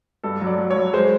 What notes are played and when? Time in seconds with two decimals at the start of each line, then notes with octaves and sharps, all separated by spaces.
0.24 G2 A4
0.41 F#3
0.47 D5
0.58 F#3
0.71 C#5
0.76 F#3
0.93 G#3 C5